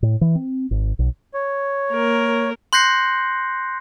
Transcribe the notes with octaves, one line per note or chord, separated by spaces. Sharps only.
A2
E3
C4
G#1
B1
C#5
A#3 A#4
C6 F#6 G6 A#6 C7 C#7